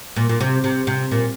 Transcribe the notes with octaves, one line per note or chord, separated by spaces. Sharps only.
A#2
A#2
C3
C3
C3
A#2